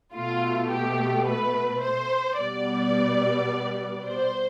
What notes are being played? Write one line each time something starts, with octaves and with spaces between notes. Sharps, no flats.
B2 A3 F4
G4
B4
C5
B2 G3 B3 D5
C5